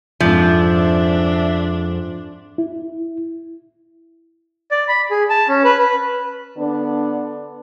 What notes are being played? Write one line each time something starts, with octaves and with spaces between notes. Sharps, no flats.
F2 G#2 F3 D4 E5
E4
D5
B5
G#4
A5
C#4
B4
B4
D3 B3 D4